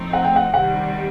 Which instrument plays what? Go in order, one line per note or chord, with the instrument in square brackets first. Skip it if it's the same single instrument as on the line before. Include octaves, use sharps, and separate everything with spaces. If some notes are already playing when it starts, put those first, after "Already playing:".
Already playing: [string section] A2 F3 A3 C4 D#4
[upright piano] F#5
G5
F#5
[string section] C3 D#3 G3 [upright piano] F#5